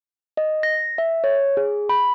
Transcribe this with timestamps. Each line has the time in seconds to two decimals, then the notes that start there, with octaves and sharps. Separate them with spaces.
0.37 D#5
0.63 A#6
0.98 E5
1.24 C#5
1.57 G#4
1.89 B5